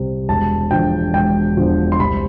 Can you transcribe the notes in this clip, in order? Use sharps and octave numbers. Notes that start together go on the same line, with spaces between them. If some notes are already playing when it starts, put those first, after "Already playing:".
Already playing: C2 C3 G3
E1 A5
E2 D3 F3 G5
E1 G5
E2 D3 F3
C6
C2 B5